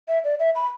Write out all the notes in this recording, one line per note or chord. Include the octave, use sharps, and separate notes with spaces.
E5
D5
E5
B5